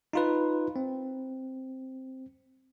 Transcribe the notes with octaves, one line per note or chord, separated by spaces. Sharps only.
D#4 F4 B4
C4